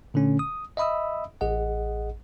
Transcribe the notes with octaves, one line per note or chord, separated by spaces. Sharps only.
A#2 D3 A3 C#4
D#6
D#5 E5 B5 D#6 E6
A1 G#4 D#5 F#5